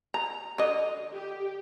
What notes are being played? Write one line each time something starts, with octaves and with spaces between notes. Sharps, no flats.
A#5
D3 D#5
G4